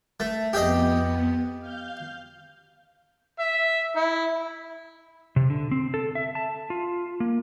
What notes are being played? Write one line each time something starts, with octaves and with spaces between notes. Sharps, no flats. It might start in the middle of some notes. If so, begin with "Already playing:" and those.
A3
F2 B3 G4 G#4 D#5
F5 G6
E5
E4
C3
D3
C4
A4
E5
A5
F4
A#3